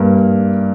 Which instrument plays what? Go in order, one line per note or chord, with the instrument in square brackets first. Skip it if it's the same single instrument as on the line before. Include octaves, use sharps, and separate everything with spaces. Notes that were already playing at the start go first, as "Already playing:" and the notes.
Already playing: [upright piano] G2 A#3